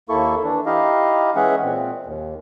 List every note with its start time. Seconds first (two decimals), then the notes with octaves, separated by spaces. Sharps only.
0.09 D#2 A#3 E4 A4 C#6
0.44 E3 D4
0.66 D#4 E4 G4 D#5 F5
1.36 E3 G#3 C#4 G#4 E5 F#5
1.62 A#2 C4
2.06 D#2